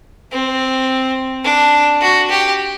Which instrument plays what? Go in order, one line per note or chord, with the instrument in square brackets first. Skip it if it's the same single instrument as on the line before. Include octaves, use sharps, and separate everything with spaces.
[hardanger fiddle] C4
D4
F#4
G4